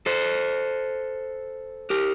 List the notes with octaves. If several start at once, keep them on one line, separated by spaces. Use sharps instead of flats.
A4 C5
G4 A#4